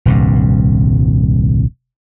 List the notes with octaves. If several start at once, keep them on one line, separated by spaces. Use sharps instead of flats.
D#1 C2 G2